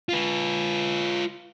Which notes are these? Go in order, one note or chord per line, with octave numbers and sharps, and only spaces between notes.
F4 B4